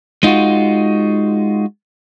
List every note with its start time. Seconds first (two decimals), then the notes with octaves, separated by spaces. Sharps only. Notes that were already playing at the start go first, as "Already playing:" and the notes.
0.23 G#3 D#4 F4 F#4